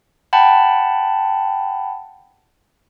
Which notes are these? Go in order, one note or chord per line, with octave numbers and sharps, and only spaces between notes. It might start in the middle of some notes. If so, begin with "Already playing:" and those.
F#5 G5 A5 B5